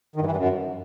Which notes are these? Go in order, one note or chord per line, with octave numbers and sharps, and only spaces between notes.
D#3
G2
E3
G2
F#2